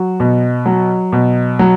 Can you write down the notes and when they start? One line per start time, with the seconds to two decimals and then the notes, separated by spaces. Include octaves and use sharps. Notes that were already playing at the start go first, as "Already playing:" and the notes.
Already playing: F#3 F#4
0.20 B2
0.66 F#3
1.13 B2
1.59 F#3